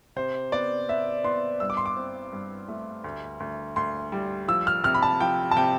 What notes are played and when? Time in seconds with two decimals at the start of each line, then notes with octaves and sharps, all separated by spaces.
0.16 C3 C5
0.52 B3 D5
0.89 B3 E5
1.24 B3 C6
1.60 G2 E6
1.70 D6
1.77 C6
1.86 D6
1.97 C4
2.32 G2
2.68 A3
3.04 D2
3.40 D2
3.76 D2 C6
4.12 G3
4.48 F3 E6
4.67 F6
4.84 C3 F6
4.94 B5
5.02 A5
5.20 F3 G5
5.51 A5
5.56 C3 G5